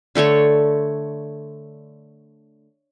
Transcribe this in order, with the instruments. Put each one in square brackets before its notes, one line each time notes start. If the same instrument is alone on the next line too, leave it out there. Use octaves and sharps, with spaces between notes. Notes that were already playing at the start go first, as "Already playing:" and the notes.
[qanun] D3 A3 A4 C#5